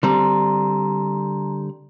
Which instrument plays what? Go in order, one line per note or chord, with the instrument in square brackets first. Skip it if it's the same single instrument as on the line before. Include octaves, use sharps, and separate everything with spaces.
[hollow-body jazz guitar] D3 G3 C4 [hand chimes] A5 A#5 C6